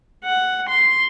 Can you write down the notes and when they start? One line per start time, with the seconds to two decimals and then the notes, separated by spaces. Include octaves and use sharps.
0.25 F#5
0.69 C6